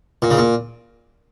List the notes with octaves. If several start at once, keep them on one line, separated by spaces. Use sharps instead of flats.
A#2
C#3
A#2